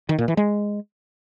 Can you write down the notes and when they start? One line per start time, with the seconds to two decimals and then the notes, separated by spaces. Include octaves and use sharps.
0.09 D#3
0.19 A#2
0.28 E3
0.37 G#3